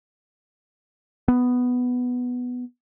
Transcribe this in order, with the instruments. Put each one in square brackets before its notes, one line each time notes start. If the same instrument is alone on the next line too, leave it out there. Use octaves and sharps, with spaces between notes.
[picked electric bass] B3